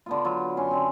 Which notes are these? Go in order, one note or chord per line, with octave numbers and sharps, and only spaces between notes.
D3 B3 F4
F#3 F4
F#2 C#4 C6
D3 C4